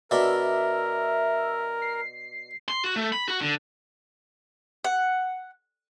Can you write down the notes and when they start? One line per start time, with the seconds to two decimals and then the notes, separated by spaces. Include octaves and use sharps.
0.11 B2 D4 A#4 E5 B5
1.82 C7
2.68 C6
2.84 F#4
2.96 A3
3.13 B5
3.28 F#4
3.42 D3
4.84 F#5